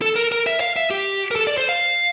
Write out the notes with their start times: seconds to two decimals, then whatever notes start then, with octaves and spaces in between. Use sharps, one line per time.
0.02 A4
0.16 A#4
0.32 A#4
0.47 E5
0.61 F5
0.76 E5
0.91 G4
1.31 A#4
1.36 A4
1.47 D5
1.58 C5
1.69 F5